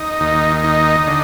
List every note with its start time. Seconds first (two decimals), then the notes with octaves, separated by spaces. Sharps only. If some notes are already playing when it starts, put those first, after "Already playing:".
Already playing: D#4
0.20 D#2
0.64 D#4
1.07 D3